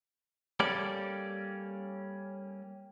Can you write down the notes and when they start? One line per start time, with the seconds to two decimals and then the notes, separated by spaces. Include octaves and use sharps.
0.60 G3 A#3 C#4 A4 D5